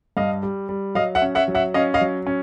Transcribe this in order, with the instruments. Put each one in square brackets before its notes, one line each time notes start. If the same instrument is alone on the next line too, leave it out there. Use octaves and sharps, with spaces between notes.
[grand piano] G2 D#5 F5
G3
G3
F#3 D#5 F5
E5 F#5
C#4
E5 F#5
F#3
E5 F#5
C#4 D#5 F5
D#5 F5
F#3
C#4